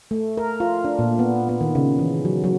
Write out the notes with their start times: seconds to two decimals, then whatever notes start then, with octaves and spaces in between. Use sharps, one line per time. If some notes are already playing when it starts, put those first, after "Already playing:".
0.11 A3
0.37 A#4
0.60 F4
0.85 D4
0.99 A#2
1.19 B3
1.49 B3
1.61 D#3
1.75 C#3
1.99 E3
2.25 F#3
2.44 F#3